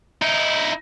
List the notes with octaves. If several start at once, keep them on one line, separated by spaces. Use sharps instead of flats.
D#4 E4